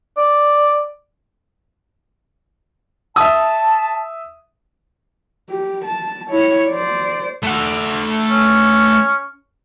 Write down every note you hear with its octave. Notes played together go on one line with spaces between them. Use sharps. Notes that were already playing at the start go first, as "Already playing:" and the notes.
D5
E5 A5 D#6
G4
A5
E4 C#5
C5 D5
A3 F#5
C#4